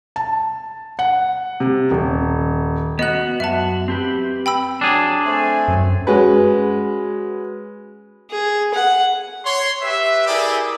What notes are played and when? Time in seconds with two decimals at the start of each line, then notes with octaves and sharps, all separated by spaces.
0.16 A5
0.99 F#5
1.60 C3
1.91 D#1
2.99 B3 F#4 D#5 F#6
3.40 F#2 F#4 E5 A5
3.88 C4 G4 B4
4.46 G5 B5 E6
4.81 F#3 D4 G#4
5.25 A3 C4 G#5
5.68 F#2
6.07 G#3 C#4 F#4 B4
8.30 G#4
8.74 F#5
9.44 C#5 C6
9.81 G4 B4 E5
10.27 E4 G4 G#4 A#4 D5